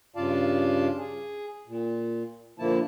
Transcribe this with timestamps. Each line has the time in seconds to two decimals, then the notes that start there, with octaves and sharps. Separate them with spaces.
0.16 G2 C#3 F4 D5 F5 A5
0.98 G#4
1.68 A#2
2.59 A#2 D3 F3 A#3 E4 A5